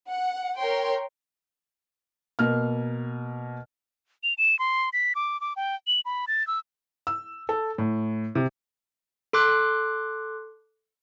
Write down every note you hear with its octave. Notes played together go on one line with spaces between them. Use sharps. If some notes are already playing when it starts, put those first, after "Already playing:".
F#5
A#4 C#5 G5 C6
B2 A#3 F6
F7
E7
C6
B6
D6
D6
G5
F#7
B5
A6
E6
E6
A4
A2
C3
A4 C6 D6 F#6